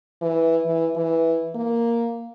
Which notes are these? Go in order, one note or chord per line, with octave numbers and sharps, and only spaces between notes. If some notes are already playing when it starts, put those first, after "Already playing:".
E3
E3
E3
A#3